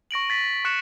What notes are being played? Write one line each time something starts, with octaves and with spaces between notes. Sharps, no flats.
C#6 A#6 D7 F#7
A6 B6
C#6 F#6 C#7 E7